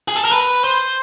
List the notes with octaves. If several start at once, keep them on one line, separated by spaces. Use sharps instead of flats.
G#4
A4
A#4
B4
C5